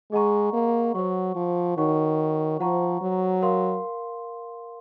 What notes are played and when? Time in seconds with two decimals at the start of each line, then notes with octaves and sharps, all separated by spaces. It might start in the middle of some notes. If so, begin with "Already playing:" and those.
0.12 G#3 G#4 D#5 F#5 A#5 C#6
0.53 A#3
0.94 F#3 C5 F#5 C#6
1.35 F3
1.77 D#3 D#4 F#4 C#5 F#5 C#6
2.59 F3 C5 F#5 A#5 C#6
3.01 F#3
3.42 A#4 F5 C6